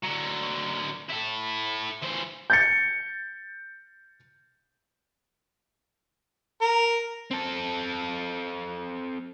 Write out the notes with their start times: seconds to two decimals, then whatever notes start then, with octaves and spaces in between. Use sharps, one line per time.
0.04 D3 F#3
1.10 E4 A4
2.03 E3 C5
2.50 G6 A6 C#7
6.62 A#4
7.31 C4 A4